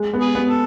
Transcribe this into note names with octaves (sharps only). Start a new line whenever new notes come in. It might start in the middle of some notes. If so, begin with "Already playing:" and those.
Already playing: G#3
B3
G#4 B4
B3
A4